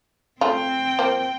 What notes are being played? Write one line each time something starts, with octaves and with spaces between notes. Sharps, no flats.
A3 C4 F4 G5
F3 A#3 C5